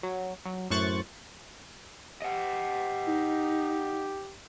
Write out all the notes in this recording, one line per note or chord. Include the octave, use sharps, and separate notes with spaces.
F#3
F#3
F#2 A2 C5 C#6 F#6 A6
G4 D#5 F#5
D#4